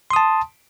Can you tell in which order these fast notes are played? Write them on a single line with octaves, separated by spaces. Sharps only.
C6 D#6 A5